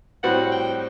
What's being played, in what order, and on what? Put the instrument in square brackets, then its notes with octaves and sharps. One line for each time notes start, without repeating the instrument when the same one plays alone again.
[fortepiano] A2 G3 C4 F#4 [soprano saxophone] F#5
[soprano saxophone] G5